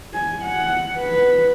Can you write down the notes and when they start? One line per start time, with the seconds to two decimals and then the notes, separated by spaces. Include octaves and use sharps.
0.14 G#5
0.42 F#5
0.99 B4